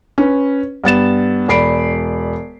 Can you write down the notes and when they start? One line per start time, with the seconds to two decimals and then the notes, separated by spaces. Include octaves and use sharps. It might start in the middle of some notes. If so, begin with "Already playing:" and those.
0.18 C#4 B4
0.84 G2 B3 A6 E7
1.48 E1 D5 B5 C7 D7